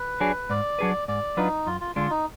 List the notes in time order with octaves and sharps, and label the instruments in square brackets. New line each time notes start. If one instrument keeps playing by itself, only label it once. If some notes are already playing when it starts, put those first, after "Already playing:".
Already playing: [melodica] B4
[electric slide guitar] F#3 D4 G#4
[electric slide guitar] G#2 [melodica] D5
[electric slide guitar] F#3 D4 G#4 B4
[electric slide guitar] G#2 [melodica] D5
[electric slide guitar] F#3 D4 F4 B4 [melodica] D#4
[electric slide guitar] F#2 [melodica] F4
[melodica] F4
[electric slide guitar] D3 G#3 D4 [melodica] F4
[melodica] D#4